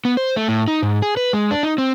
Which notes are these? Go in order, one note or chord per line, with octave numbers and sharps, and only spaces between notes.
B3
C5
A3
A2
D#4
G#2
G#4
B4
G#3
D4
D#4
C4